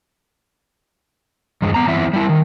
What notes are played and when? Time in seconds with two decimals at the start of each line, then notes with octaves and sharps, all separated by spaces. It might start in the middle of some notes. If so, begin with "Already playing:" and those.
1.62 E2 G2 G#3
1.74 B3 A#5
1.88 E3 B3 C4 E4 E5
2.13 G3 E4
2.29 D#3